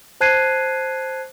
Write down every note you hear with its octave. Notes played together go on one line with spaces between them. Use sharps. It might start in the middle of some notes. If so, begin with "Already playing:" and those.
C5 A5 F#6 G#6 C7 D#7